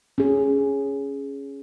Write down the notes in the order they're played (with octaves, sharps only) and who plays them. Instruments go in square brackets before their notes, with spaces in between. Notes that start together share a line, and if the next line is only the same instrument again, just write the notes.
[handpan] C#4 G#4